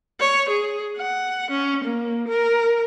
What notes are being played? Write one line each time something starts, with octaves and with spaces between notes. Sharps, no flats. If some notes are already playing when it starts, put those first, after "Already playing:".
C#5
G#4
F#5
C#4
A#3
A#4